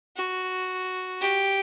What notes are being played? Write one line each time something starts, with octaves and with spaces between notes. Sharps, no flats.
F#4
G4